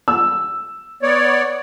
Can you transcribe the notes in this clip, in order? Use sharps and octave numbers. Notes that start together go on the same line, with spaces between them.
E6
B3 C#5 D5